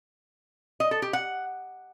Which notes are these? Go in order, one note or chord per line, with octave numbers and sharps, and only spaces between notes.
D#5
A4
G4
F#5